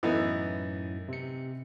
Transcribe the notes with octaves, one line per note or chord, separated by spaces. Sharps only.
F#2 A2 E3 B3 D#4 A6
C3 C#7